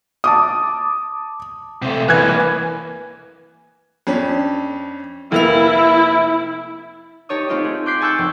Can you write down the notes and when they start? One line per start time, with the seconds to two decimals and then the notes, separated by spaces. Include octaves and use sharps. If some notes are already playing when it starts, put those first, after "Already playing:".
0.24 A5 D6 D#6
1.82 C3 A3
2.08 E3 A#3 B4 G#5 F#6 G#6
4.07 F2 C#4 D4
5.32 F1 A#3 E4 F7
7.29 D#4 G4 C#5 A5 C#6 D#6
7.49 A3 C4 D#4 F4 G4
7.65 G#4
7.86 C6 D6 F#6 G6 B6 C7
8.01 G#5 A5 C#6 E6 F#6 G6
8.18 F1 G5